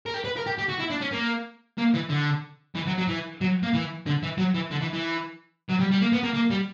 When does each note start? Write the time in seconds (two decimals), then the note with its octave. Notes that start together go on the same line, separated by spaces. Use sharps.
0.06 A#4
0.14 G4
0.25 B4
0.37 A#4
0.47 G4
0.59 G4
0.69 F#4
0.79 E4
0.91 D4
1.02 C#4
1.13 A#3
1.78 A#3
1.94 E3
2.10 D3
2.75 E3
2.86 F#3
2.98 F#3
3.08 E3
3.41 F#3
3.63 A#3
3.74 E3
4.06 D3
4.23 E3
4.38 F#3
4.55 E3
4.71 D3
4.81 E3
4.93 E3
5.69 F#3
5.80 G3
5.91 G3
6.01 A#3
6.12 B3
6.23 A#3
6.35 A#3
6.50 G3